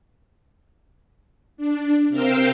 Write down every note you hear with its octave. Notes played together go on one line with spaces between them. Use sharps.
D4
C3 A#4 C5 F5 G5 E6